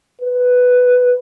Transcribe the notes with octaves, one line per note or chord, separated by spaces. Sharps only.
B4